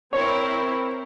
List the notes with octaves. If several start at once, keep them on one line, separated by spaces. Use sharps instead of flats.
C4 E4 A#4 C#5